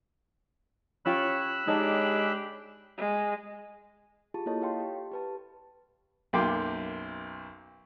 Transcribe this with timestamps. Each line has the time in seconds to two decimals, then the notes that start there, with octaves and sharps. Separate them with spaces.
1.06 C#4 F4 G4 C#5 B5 E6 F#6
1.67 G#3 D4 D#4 G4 C#5 A5
2.98 G#3
4.34 F4 G4 G#4 A5
4.46 A#3 E4 A4 C#5 D#5 A5
4.62 C#5 F5 G5 C6
4.80 G4
5.11 G4 B4 A5
6.33 B1 F#2 A#3 G5 C6 D6